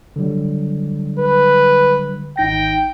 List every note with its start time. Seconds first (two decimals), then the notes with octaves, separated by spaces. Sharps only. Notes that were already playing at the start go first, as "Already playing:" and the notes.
0.16 D3 F#3 G3
1.19 B4
2.37 G#1 D#4 G5 A#6